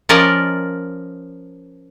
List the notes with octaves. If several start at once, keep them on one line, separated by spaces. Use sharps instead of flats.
F3 C#4 A#4 D5 D#5 F5